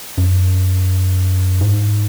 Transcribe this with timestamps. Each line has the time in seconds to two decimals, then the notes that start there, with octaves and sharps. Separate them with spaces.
0.18 F#2
1.61 G#2